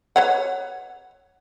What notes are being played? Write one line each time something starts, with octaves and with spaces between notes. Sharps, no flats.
B4 C#5 F#5